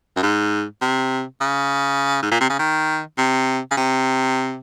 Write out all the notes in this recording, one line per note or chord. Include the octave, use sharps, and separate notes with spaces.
F#2
G#2
C3
C#3
G#2
A#2
C3
C#3
D#3
C3
C#3
C3